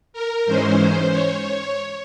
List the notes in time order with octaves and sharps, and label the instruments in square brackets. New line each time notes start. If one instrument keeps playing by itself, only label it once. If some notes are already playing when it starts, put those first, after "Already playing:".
[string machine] A#4
G#2 E3 G#3 C#4 C5
C#5